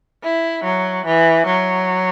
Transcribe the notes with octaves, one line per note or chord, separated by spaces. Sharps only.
E4
F#3
E3
F#3